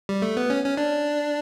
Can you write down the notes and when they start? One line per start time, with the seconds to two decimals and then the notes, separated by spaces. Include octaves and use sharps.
0.09 G3
0.22 A3
0.37 B3
0.50 C#4
0.64 C#4
0.77 D4